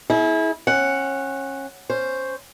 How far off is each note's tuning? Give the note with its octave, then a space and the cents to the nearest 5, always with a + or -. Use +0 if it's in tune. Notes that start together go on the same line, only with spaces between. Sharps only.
E4 -25 G#4 +35
C#4 -25 F#5 +0
C#4 +0 C5 +0